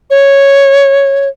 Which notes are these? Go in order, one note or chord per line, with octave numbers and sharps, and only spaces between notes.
C#5